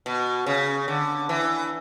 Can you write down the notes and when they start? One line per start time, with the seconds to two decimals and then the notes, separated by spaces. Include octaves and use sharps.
0.06 B2
0.46 C#3
0.88 D3
1.29 E3